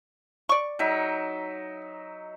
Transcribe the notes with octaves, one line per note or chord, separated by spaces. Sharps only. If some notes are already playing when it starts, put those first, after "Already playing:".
D5 C#6
F#3 D#4 E5